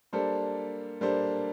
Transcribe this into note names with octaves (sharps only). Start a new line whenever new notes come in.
G3 A#3 D4 A4 C5
G3 A#3 D4 A4 C5